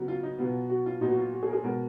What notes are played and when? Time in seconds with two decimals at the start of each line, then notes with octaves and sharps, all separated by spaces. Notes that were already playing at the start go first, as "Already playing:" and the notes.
Already playing: C#3 F#3 B3
0.08 F4
0.23 D#4
0.38 B2 F#3 B3 F4
0.70 F#4
0.86 F4
1.01 A#2 F#3 B3 D#4
1.09 F#4
1.17 F4
1.33 F#4
1.43 G#4
1.48 A#4
1.53 G#4
1.64 B2 G#3 B3 A#4